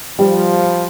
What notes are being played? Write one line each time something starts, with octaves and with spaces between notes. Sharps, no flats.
F3 G3